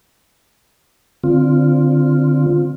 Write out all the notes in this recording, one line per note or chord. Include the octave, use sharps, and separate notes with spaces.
D3 C4 F4